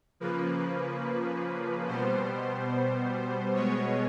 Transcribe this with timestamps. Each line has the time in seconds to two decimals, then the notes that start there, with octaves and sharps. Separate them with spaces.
0.20 C#3 F3 A#3 B4
1.87 B2 G3 B3 C5
3.54 B2 G#3 B3 C#5